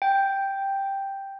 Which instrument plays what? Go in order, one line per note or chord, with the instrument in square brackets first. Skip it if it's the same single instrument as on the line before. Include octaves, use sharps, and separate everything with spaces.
[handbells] G5